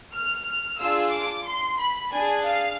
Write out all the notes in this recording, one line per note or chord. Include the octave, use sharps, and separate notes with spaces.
F6
D4 F4 G#4 E6
D6
C6
B5
D4 G#4 G#5
F5